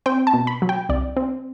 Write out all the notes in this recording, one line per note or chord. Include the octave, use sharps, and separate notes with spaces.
C4 G5
A5
B2
B5
F#3
G5
C2 D5
C4